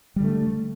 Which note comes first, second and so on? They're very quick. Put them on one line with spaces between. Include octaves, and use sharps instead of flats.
G3 D3 A3